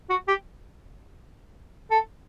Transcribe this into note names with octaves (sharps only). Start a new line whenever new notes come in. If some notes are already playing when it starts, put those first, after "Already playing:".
F#4
G4
A4